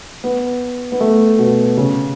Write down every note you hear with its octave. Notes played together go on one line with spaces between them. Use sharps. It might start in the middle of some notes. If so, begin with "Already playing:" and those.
B3
B3
A3
B2
C#3